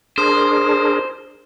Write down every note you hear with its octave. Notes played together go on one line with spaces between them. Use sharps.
D4 G#4 A#4 C5